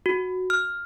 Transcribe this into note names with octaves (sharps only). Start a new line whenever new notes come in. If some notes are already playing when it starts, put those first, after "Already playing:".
F#4
F6